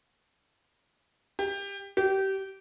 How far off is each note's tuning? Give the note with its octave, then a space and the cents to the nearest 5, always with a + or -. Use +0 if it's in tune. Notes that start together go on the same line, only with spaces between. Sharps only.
G4 +20
G4 -25